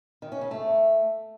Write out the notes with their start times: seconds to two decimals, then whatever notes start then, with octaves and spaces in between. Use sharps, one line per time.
0.22 D#3
0.32 C#4
0.41 C#3
0.51 A3